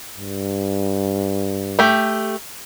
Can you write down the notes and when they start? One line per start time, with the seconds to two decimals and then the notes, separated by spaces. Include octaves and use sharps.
0.18 G2
1.79 A3 G4